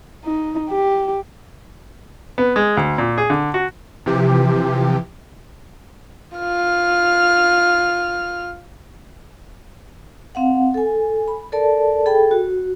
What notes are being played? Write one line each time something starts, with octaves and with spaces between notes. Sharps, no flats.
D#4
G4
B3
G#3
D2
A#2
G#4
D3
F#4
C3 E3 F3 G4
F4 F6
C4 F5 F#5
A4 G#5
B5
A4 A#4 D5 A5
G#4 A4 G5 B5
F#4